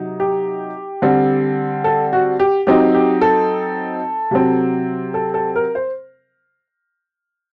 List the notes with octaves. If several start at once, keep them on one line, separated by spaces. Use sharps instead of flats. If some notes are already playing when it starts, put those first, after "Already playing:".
Already playing: C3 F#3 D#4
G4
D3 G3 C4
A4
F#4
G4
F#3 C4 D#4 G4
G4
A4
C3 F#3 C4
A4
A4
A#4
C5